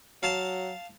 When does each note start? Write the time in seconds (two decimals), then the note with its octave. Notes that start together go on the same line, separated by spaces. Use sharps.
0.23 F#3 F5 A5